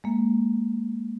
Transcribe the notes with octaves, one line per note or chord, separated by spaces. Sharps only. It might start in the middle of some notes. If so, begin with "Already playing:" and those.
G#3 A#3